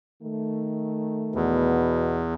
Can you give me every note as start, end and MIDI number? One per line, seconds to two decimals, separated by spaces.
0.21 1.81 51
0.21 1.81 57
1.35 2.34 40
1.35 2.25 47